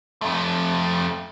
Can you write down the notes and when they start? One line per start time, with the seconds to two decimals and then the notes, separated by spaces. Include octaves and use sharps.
0.22 F2 A3